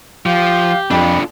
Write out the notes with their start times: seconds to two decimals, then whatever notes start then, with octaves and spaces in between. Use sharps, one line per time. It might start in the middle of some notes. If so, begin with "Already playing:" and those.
0.26 F3 G4 F5
0.91 F2 D4 F4 B5